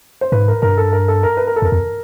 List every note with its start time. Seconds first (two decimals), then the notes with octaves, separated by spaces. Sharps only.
0.21 C5
0.32 G#2 B4
0.48 A#4
0.62 G2 A#4
0.77 A4
0.93 A#4
1.08 A4
1.23 A#4
1.37 B4
1.47 A#4
1.56 A4
1.62 F2 A#4
1.72 F2